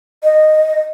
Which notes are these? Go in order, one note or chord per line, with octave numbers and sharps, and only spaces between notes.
D#5